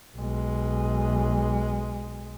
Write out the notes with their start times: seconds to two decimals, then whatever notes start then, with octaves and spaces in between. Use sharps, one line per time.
0.17 B1 G#3